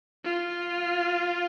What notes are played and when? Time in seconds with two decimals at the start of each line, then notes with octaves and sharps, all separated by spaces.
0.25 F4